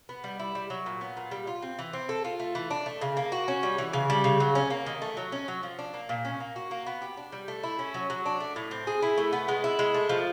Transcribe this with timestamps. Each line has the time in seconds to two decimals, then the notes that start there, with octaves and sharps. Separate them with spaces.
0.09 B3
0.24 G3
0.39 E4
0.55 G3
0.70 F#3
0.86 A#2
1.01 B3
1.17 A#2
1.31 G3
1.47 F4
1.62 C4
1.79 E3
1.93 C4
2.09 A4
2.25 F4
2.40 A3
2.55 E3
2.71 D4
2.86 A3
3.01 C#3
3.17 A#3
3.32 F#4
3.48 C#4
3.63 G3
3.78 E3
3.93 C#3
4.10 G3
4.24 C#3
4.40 F#3
4.55 C#4
4.70 A#3
4.86 D#3
5.02 A3
5.17 F#3
5.32 C#4
5.48 F#3
5.63 F3
5.79 D4
5.94 A#3
6.09 A#2
6.25 C#4
6.40 A#3
6.56 F#4
6.71 A#3
6.86 B3
7.02 G4
7.17 D4
7.32 G3
7.48 A3
7.63 E4
7.79 C#4
7.94 F#3
8.10 F#3
8.26 D4
8.40 A3
8.56 A2
8.71 C4
8.87 G#4
9.02 E4
9.18 A3
9.33 B3
9.48 G#3
9.64 E4
9.79 G#3
9.94 A3
10.09 F3